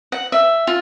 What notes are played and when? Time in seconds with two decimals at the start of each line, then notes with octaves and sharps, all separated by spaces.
0.12 F#5
0.32 E5
0.67 F4